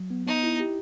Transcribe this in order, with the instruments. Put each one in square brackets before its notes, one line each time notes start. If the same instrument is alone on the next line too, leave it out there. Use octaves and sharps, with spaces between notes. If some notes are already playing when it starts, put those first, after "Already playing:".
Already playing: [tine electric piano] F#3
B3
[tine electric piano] B3 [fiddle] D#4
[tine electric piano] E4
G4